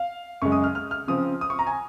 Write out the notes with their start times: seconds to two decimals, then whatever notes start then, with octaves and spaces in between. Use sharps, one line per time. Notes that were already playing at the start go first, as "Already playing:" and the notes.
Already playing: F5
0.42 F#2 C#3 G#3 C#6
0.52 D#6
0.64 F6
0.75 F6
0.91 F6
1.08 C#3 F3 C4 D#6
1.41 D#6
1.50 C#6
1.59 A#5
1.67 G#5